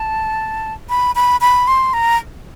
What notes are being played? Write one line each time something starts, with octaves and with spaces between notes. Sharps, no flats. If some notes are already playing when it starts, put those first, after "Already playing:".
Already playing: A5
B5
B5
B5
C6
A#5